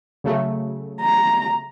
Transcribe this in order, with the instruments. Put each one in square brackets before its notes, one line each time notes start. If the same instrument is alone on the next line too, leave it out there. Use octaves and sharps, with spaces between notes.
[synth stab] C#3 F#3 A3
[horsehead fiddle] A#5